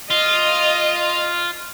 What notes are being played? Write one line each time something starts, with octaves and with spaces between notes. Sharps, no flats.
F4 D#5